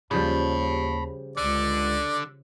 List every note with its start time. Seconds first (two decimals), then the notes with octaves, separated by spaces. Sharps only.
0.11 D#2 C#3 F3 G3 A5 B5
1.37 C#2 D3 D5